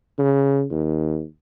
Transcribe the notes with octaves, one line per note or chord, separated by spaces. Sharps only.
C#3
D#2